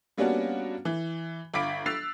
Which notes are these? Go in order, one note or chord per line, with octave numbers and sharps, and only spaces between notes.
G3 A#3 B3 C#4 D4 F#4
E3
G1 F5 B5 D6 B6 D7
E6 F#6 A6 C7 F7